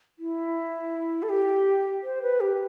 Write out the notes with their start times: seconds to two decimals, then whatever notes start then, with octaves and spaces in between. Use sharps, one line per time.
0.19 E4
1.23 A4
1.29 G4
2.03 C5
2.22 B4
2.40 G4